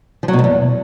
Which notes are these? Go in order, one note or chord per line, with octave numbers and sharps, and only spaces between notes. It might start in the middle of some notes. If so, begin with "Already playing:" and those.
F3
F#3
B2
G#2
E2